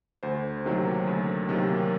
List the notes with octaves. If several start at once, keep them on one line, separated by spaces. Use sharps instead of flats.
D2 C5
C3 D#3 F#3 A#3
D2
C3 D#3 F#3 A#3